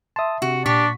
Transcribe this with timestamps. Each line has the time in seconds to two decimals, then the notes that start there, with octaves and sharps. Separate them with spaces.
0.16 E5 A5 C6 D#6
0.42 C3 F#4
0.66 A#2 D4 G4 C#6 B6